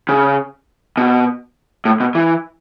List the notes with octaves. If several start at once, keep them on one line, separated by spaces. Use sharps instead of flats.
C#3
B2
A2
B2
E3